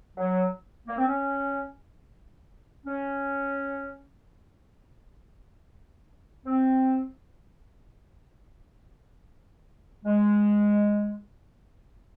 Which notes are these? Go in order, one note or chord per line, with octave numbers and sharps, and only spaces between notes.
F#3
A#3
C4
C#4
C#4
C4
G#3